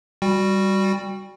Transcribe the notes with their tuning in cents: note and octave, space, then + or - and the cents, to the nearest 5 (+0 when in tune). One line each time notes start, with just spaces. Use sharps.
G3 +0 F#4 +0 G5 +25